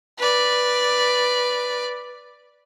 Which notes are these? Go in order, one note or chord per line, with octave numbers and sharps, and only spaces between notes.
B4 D5